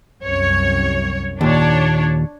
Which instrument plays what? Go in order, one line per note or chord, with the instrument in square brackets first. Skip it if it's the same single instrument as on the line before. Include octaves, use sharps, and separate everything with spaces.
[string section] C2 F#2 C#5
[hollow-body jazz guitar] D#2 A#2 [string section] D4 C#5